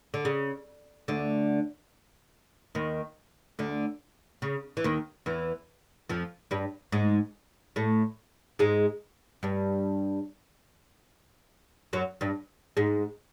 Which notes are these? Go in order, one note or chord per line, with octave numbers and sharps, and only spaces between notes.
D3
C#3
D2 D3
D#2 D#3
D2 D3
C#3
E3
D#2 D#3
E2 E3
F2 F3
G2 G3
G#2 G#3
A2 A3
G#2 G#3
G2 G3
F#2 F#3
G2 G3
G#2 G#3